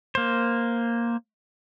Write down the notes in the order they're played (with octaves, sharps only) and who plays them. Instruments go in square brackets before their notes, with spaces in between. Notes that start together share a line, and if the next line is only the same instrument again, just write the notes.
[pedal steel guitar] A#3 C5